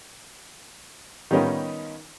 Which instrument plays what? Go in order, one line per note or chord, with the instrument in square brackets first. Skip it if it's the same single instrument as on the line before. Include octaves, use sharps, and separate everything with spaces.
[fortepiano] D#3 G3 B3 C#4 D#4 F4